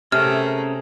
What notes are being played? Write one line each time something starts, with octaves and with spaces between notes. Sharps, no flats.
C3 A3 C#4 G#4 A#4 F6